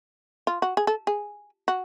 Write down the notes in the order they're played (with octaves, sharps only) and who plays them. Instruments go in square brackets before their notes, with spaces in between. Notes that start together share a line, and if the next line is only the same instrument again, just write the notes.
[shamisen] F4
F#4
G#4
A4
G#4
F#4